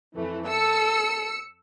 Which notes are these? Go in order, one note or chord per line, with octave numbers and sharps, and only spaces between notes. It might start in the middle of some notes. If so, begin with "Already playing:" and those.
F2 E3 A3
A4 E6 C#7